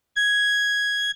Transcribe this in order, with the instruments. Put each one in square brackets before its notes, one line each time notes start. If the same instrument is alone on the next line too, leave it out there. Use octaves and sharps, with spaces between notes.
[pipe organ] G#6